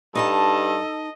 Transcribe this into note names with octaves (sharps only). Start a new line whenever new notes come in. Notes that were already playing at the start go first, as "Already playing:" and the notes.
G2 D#4 A4 D#5 G#5 A5